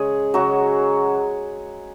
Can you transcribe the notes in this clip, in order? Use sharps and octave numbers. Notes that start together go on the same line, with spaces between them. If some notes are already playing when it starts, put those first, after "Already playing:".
Already playing: C#3 G#3 G#4
C#3 F#3 G#3 F#4